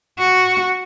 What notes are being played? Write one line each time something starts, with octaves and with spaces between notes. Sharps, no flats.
F#4